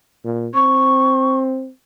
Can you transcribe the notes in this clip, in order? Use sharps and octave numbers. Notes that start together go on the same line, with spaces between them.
A#2
C4 C#6